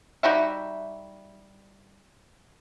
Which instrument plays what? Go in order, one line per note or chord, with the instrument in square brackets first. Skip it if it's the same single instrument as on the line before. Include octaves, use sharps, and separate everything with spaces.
[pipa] G3 D#4 F#4 E5